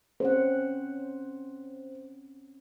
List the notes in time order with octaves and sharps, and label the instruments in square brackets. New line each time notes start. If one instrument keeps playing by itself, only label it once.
[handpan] C4 C#4 F#5 [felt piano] C5